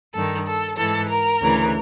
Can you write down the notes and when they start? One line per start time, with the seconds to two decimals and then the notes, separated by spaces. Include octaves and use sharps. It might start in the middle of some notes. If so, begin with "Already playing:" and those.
0.14 G2 D#3 A4
0.47 A4
0.78 G#2 E3 A4
1.09 A#4
1.41 D2 C#3 E3